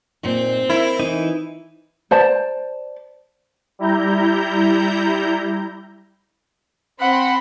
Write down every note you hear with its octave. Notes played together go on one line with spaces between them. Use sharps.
A#2 C4 D#4 F4
E4 A#4
E3 D#4
C5 D5 A5
G3 E4 A#5 G6
C4 F#5 B5 C6